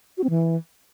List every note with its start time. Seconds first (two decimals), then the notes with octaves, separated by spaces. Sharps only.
0.18 F#4
0.24 C4
0.30 E3